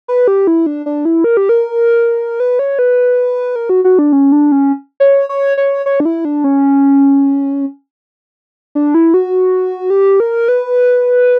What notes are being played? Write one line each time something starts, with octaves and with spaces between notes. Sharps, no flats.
B4
G4
E4
D4
D4
E4
A#4
G4
A#4
B4
C#5
B4
A#4
F#4
F#4
D4
C#4
D4
C#4
C#5
C#5
C#5
C#5
D4
E4
D4
C#4
D4
E4
F#4
G4
A#4
B4